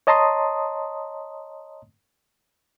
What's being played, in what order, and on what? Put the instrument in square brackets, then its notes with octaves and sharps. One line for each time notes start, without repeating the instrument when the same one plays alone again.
[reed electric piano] C#5 D#5 A5 A#5 C6 D#6